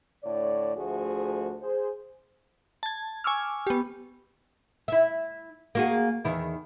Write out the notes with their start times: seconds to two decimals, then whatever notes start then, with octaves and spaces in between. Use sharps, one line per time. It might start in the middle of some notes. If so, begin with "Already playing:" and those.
0.24 A2 D3 C#5 D5
0.76 D2 F3 A3 F#4 G#4
1.62 G#4 C5
2.83 A5 G#6
3.24 G#5 C#6 D6 E6 F6
3.67 B3 G4
4.88 E4 E5
5.75 A#3 F#4 G#4
6.25 E2 D#3 E4